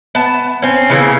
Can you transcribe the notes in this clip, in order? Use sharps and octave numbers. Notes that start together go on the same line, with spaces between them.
B3 A5
C4 C#4
C#3 E3 A3 A#3